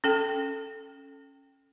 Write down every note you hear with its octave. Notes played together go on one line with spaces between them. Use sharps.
C#4 A4 G5